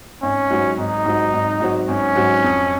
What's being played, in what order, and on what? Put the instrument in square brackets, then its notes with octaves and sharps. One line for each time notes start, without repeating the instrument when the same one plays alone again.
[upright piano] G#1 [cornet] C#4
[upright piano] G#2 F#3 C4 F#4
[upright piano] G#1 [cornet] D#4
[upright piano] G#2 F#3 C4 F#4
G#1
G#2 F#3 C4 F#4
[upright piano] G#1 [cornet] C#4
[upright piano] G#2 F#3 C4 F#4
F2